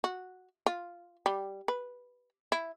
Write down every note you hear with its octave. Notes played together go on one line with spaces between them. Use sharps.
F#4
F4
G3
B4
E4